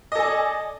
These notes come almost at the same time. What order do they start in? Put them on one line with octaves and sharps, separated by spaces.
D#5 A4 G#5 D5